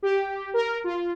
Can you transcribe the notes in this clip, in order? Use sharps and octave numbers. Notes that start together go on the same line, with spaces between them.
G4
A#4
F4